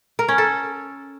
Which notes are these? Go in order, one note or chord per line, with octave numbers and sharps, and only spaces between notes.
A#4
C#4
A4